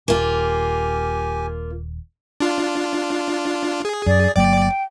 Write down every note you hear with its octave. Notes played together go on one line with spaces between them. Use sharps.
D#1 A#3 C#4 F4 G4 G#5
D4 F4
G#4
F#2 D5
G1 F#3 A#3 D5 G5